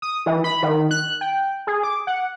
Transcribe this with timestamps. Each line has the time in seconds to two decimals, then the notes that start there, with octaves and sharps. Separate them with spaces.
0.02 D#6
0.26 E3
0.44 B5
0.63 D#3
0.91 F#6
1.21 G5
1.67 G#4
1.83 D6
2.07 F#5